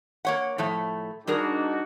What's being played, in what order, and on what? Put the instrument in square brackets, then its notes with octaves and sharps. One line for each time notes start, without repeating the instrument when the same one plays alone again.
[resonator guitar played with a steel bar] A#3 C#5 F#5
A2 F3 A3
[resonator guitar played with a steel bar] G3 G#4 A#4 [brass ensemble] D4 D#4 F#4